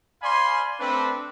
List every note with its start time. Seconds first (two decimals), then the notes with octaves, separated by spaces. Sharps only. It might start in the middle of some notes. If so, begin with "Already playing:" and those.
0.22 C5 D5 F5 G#5 B5 C6
0.80 A3 C4 D4 B4